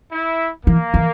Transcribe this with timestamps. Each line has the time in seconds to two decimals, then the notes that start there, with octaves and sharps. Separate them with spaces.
0.11 E4
0.66 E3 A#3
0.94 E3